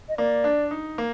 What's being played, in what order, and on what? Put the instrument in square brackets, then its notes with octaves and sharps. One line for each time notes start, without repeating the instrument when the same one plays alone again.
[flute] D#5
[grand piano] A#3 [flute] D5
[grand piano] D4
D#4
A#3